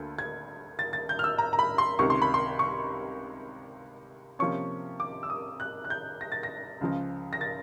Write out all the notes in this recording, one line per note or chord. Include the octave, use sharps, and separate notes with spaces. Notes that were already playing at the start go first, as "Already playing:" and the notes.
Already playing: D2 D3 A#3
G#6
A6
A6
G6
F6
E6
A#5
A#5
B5
C6
C#2 C3 D#3 C#6
C6
B5
C6
C#6
C3 F3 A#3 C#4 C#6
D6
E6
D#6
F#6
F#6
G6
A#6
A6
A#6
C#2 C#3 F3
A#6
A6